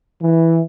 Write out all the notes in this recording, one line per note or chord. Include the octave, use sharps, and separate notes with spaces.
E3